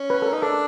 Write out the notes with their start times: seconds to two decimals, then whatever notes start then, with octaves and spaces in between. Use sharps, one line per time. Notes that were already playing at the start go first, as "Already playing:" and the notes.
Already playing: C#4
0.10 B4
0.22 A4
0.26 A#4
0.33 D#4
0.42 D4 A4